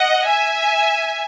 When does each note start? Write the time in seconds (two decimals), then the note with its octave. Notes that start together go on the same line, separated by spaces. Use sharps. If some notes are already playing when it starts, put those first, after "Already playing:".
Already playing: D#5 F#5
0.26 E5 G#5